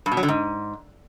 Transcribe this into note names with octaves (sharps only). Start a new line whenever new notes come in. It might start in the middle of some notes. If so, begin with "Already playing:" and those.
G2
B2
F#3
D3
G#2